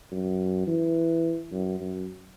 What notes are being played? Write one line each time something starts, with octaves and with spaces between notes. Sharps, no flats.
F#2
E3
F#2
F#2